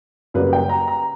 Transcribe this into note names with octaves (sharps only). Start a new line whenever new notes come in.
F#2 C#3 G3 A#3 B4
G5
A#5
A#5